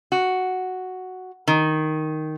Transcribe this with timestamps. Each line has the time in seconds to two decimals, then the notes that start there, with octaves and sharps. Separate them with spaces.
0.12 F#4
1.48 D#3